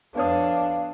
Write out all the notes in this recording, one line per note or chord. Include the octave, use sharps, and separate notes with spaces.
F2 B3 D4 C#5 F5 D#6